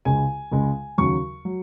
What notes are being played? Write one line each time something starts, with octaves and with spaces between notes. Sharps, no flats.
C#2 C#3 G#3 G#5
C#2 C#3 G#3
D#2 C#3 F#3 C#6
F#3